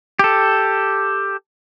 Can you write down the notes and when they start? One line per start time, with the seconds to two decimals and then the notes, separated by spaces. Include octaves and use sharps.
0.19 G4 A4